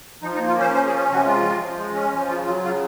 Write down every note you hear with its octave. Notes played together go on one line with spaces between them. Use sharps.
F3 D#4
D#4
A#3
F4
C#4 C5
F3 C5
G#4
C#4
C3 F#4
G#3 F4
F3
F3
G#3
C#4
F3
C#3 F4
F#3 F4
C#3 F4